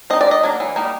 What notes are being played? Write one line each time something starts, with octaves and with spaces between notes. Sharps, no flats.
C4 D#4 D#5
D5
D#3 D#5
F#3 A#3 D4
E3
G3 A#3 D#4